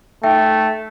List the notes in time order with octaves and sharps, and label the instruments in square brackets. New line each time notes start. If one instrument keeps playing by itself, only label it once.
[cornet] A3 [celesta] D#4 E5 G5